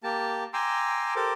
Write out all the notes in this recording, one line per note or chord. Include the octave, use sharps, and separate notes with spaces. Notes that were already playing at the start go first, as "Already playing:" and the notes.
A#3 G4 A5
G5 G#5 A#5 C6 D6 E6
G4 A4 A#4 C5 D6